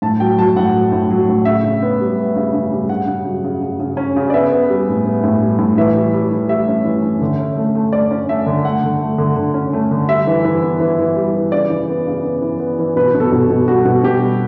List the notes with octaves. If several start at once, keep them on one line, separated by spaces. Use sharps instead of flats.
A2 A5
F#3 G5
F#3 A5
A2 F#5
F#3
A2
F#3
A2
C#3 E5
C#3
B3
G3
B3
C#3
C#3
G3
C#3 F#5
C#3
F#3
C#3
C#3
C#3
C#4
C#3
D5
B3 E5
B3
G3
A2
B3
A2
G3
A2
E3 E5
G3
G3
E3
G3 E5
C#4
E3
C#4
D3
C#4
A3
A3
A3 D5
C#4
A3 E5
D3
A3 F#5
D3
A3
D3
D3
C#4
A3
D3
G3 E5
E3
E3
B3
E3
E3
G3
E3
C#3 D5
E3
B3
C#3
B3
E3
B3
E3
B2 B4
B2
A4
B2
B2
G3 F#4
B2
B2 G4
G3